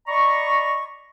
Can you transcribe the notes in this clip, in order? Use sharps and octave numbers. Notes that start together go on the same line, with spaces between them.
D5 D#5 A#5 B5 C#6